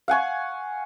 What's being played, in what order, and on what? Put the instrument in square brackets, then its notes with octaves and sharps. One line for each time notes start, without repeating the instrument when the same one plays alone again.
[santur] F5 F#5 G#5 C#6